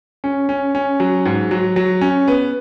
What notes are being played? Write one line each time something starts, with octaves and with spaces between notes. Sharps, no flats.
C#4
C#4
C#4
F#3
G#2
F#3
F#3
C#4
B3